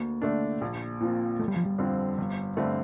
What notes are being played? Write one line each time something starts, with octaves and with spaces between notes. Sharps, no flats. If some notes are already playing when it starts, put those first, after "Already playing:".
Already playing: D2 A#3
D3 A3 D4
A#1
A#2 F3 C4
G1 A3
G3
F3
G3
F2 D3 F3 C4
G1
G2 D3 A3 C4